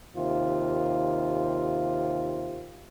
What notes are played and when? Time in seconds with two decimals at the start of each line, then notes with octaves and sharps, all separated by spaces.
0.16 D#2 C3 F4